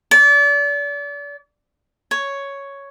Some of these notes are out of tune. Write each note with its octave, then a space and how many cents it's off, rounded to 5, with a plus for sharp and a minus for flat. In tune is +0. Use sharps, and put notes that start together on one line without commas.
D5 -35
C#5 +5